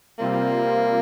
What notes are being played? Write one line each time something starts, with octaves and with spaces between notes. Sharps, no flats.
C3 G3 A#3 C4 F4